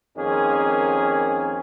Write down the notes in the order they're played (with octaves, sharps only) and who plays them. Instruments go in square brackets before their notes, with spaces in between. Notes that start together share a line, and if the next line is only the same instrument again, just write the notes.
[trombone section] F2 D#3 A#3 C#4 G#4